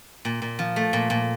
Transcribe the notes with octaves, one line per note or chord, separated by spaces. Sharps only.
A#2
A#2
F3
A3
A#2
A#2